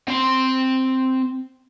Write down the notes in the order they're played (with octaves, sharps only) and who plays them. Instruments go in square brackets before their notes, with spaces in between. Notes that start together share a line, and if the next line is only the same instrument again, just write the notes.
[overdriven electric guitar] C4 C6